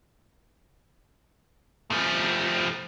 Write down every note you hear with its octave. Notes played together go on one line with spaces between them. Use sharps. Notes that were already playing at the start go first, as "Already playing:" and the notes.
F3 A3